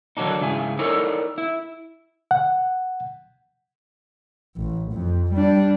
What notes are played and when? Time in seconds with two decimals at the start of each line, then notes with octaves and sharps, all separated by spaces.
0.17 D3 D#3 F#3 G#3 D4 D#4
0.41 G#2 C#3 E4 G#4
0.79 D#4 E4 A4 A#4 C#5 D5
1.38 E4
2.31 F#5
4.56 A1
4.93 F2
5.34 G3 D4